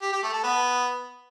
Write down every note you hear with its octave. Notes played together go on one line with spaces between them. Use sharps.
G4
G4
A3
A4
B3